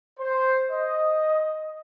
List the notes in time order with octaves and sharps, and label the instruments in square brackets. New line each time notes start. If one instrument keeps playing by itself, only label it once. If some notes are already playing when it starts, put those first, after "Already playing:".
[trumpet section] C5
D#5